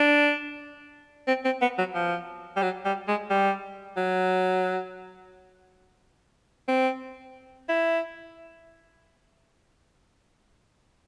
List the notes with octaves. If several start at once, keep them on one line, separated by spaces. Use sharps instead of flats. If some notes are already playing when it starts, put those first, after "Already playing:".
Already playing: D4
C4
C4
B3
F#3
F3
G3
F#3
G3
G#3
G3
F#3
C4
E4